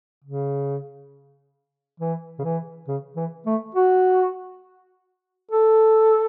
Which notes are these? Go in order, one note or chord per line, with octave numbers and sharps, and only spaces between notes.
C#3
E3
C#3
E3
C#3
E3
A3
F#4
A4